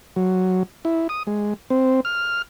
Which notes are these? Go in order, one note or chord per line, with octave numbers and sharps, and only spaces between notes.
F#3
E4
D#6
G#3
C4
F6